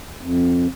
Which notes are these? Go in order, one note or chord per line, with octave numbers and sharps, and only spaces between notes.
F2